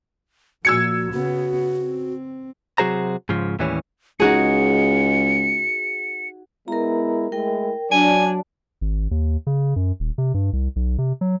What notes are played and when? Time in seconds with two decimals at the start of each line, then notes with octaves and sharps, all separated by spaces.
0.65 A#2 F3 F#4 E6 G#6 C#7
1.12 C#3 B3 F#4
1.79 C4
2.78 C3 F#3 F#4 G#4 C5 A#5
3.29 G#2 C#3 F3
3.59 D#2 A2 E3 G3 C#4
4.20 C#2 D#4 F#4 G#4 C#7
6.68 G#3 B3 E4 A#4 A#5
7.32 G#3 A3 E4 A#4 G5
7.91 F#3 D4 D5 G#5 A5
8.81 G#1
9.11 D#2
9.47 C#3
9.76 F#2
10.00 D#1
10.18 C3
10.34 G2
10.53 C2
10.76 B1
10.98 C3
11.21 F#3